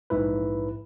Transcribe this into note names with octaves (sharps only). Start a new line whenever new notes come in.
A#1 G#2 E4 B4